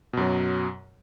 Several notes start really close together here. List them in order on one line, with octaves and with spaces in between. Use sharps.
B2 F#2 F#3